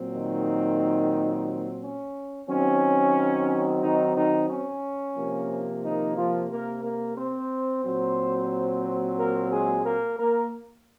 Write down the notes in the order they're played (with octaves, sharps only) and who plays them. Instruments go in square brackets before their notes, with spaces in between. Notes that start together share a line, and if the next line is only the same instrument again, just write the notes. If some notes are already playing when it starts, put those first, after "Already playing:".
Already playing: [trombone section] A#2 F#3 C4
D#3 D#4
C#4
D#3 F#3 C4 C#4
D#3 D#4
D#3 D#4
C#4
C3 F3 A#3
D#3 D#4
F3 F4
A#3 A#4
A#3 A#4
C4 C5
A#2 F#3 C4
A#3 A#4
G#3 G#4
A#3 A#4
A#3 A#4